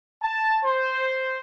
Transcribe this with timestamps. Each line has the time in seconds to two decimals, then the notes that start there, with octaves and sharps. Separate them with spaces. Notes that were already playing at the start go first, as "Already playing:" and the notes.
0.22 A5
0.65 C5